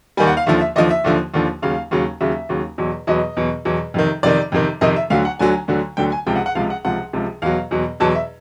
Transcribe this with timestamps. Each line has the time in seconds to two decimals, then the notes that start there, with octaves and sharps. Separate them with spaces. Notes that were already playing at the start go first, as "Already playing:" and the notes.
0.17 D#2 D#3 G3 G#5
0.27 F#5
0.37 F5
0.46 D#2 D3 F3 E5
0.61 E5
0.76 D#2 D3 F3 D#5
0.90 E5
1.04 D#2 D3 F3
1.34 D#2 D3 F3
1.62 D#2 C#3 F#3 F5
1.91 D#2 C#3 F#3
2.21 D#2 C#3 F#3 E5
2.49 D#2 C#3 F#3
2.78 E2 B2 F#3
3.07 E2 B2 F#3 D#5
3.37 E2 B2 F#3
3.65 E2 B2 F#3
3.94 F2 C3 D#3
4.23 F2 C3 D#3 D5
4.52 F2 C3 D#3
4.81 F2 C3 D#3 D#5
4.96 E5
5.10 D2 D3 F#3 F5
5.25 F#5
5.39 D2 D3 F#3 G#5
5.68 D2 D3 F#3
5.97 D2 D3 F#3 G5
6.12 G#5
6.26 C#2 C3 F3 G5
6.36 F#5
6.46 F#5
6.55 C#2 C3 F3 F5
6.70 F#5
6.85 C#2 C3 F3 F#5
7.13 C#2 C3 F3
7.42 E2 B2 F#3 F5
7.71 E2 B2 F#3
8.00 E2 B2 F#3 A5
8.15 E5